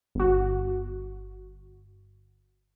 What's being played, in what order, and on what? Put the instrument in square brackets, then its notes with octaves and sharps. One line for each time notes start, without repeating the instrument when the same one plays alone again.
[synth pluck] G1 F#4